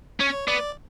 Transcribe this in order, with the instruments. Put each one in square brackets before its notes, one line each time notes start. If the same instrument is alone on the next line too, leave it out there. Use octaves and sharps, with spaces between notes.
[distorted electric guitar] C#4 [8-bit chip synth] C#5
[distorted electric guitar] B3 [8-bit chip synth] D5